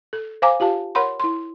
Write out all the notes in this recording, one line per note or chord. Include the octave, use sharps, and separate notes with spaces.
A4
C5 F5 G#5 A#5 D6
F4 G4 F5 A5
A#4 C#5 F#5 B5 C6
E4 C6